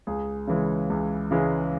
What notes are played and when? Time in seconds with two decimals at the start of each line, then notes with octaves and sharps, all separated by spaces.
0.07 C#2 G#4
0.48 C#3 E3 G#3
0.90 C#2
1.31 C#3 E3 G#3